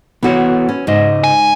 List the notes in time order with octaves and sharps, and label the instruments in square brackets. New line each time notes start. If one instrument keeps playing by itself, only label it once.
[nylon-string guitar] E3 F#4 [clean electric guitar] B3 A4 C#5
[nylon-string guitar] C#4
[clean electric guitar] C#2 D#5 [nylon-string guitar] G#2
[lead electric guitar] G#5